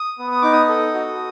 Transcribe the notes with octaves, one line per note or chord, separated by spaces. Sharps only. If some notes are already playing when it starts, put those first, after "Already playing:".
Already playing: D#6
B3
D#6
D#4 D6
D#6
A4
F#4